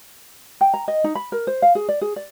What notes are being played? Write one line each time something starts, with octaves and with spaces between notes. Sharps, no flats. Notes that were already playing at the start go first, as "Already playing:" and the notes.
G5
A#5
D#5
D#4
B5
A#4
C5
F5
G#4
D5
G#4
D5